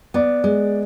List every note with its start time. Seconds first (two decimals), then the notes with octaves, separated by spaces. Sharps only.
0.14 B3 D5
0.44 G#3